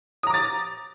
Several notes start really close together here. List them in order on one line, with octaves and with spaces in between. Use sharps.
D#6 A#5 D6 A6